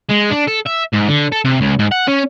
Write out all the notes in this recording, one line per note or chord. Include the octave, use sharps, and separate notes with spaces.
G#3
D4
A4
E5
G#2
D3
A4
C3
C#2
G#2
F#5
C#4